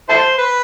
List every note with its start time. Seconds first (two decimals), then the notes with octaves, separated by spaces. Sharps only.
0.09 E4 A4 C5
0.38 B4